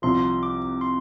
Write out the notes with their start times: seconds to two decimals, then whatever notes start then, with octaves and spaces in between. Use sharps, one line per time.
0.02 C2 C3 F3 C6
0.43 D6
0.81 C6